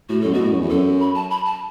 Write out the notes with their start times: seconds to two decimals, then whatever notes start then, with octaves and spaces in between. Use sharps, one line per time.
0.09 A2 F#4
0.21 F#2 A4
0.33 B2 F#4
0.40 A2
0.50 F#2
0.59 E2
0.69 F#2 A4
1.00 B5
1.15 A5
1.31 B5
1.46 A5